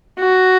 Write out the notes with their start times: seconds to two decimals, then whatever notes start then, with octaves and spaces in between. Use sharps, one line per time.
0.20 F#4